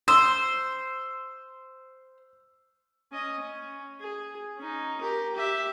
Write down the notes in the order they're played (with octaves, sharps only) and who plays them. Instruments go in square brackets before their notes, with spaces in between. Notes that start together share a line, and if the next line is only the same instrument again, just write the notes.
[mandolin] C5 [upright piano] E6
[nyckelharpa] C#4 D#5
C#4
G#4
C#4 D#4
G4 A#4
G4 E5